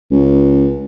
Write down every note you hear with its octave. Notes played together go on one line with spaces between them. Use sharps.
C#2